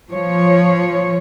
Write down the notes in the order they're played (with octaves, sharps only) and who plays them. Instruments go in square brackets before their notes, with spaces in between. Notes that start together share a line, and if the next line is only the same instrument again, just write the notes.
[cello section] F3 C#5